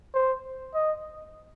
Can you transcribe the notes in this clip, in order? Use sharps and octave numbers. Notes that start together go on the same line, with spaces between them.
C5
D#5